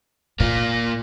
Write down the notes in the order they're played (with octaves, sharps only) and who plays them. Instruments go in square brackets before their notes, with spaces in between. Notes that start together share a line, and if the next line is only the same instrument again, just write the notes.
[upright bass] A#2 [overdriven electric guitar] A#3 F4